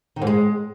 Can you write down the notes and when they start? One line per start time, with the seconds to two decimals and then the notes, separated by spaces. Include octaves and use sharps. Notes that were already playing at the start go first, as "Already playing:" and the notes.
0.16 D#3
0.22 G#2
0.27 G#3